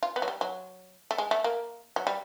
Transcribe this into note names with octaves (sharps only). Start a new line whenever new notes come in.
F4
B3
F#3
G3
F#3
A3
G#3
A3
A#3
F#3
G3